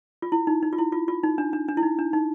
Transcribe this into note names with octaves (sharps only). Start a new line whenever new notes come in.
F4
E4
D#4
D#4
F4
E4
F4
F4
D#4
D4
D4
D4
E4
D#4
D4
D#4